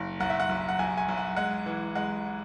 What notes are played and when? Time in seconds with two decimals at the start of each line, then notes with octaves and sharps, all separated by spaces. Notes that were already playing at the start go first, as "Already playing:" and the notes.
Already playing: F#1
0.20 B1 F#5
0.30 E5
0.40 F#5
0.49 B1
0.68 F#5
0.79 B1 G#5
0.97 G#5
1.08 B1
1.17 F#5
1.36 G#3 F#5
1.66 E3
1.95 G#3 F#5